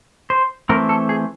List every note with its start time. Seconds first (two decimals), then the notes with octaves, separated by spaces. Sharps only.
0.30 C5
0.69 E3 A3 C4 A#4
0.89 A4
1.09 G#4